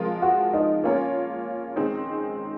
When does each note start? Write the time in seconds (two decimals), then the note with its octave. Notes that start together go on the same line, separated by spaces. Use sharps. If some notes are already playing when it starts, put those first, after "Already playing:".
Already playing: F3 G#3 C4 F4 A#4
0.22 F#4
0.53 D#4
0.84 A#3 C#4 F4 A#4 C#5
1.76 D#3 G#3 C4 D#4